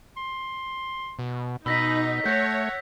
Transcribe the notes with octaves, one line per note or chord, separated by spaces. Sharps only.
C6
B2
B2 D#4 B5 E6 A#6 B6
A3 C#5 F#5 G6 A#6